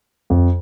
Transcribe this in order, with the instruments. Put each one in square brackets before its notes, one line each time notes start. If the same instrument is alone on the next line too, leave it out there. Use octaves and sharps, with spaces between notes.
[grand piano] F2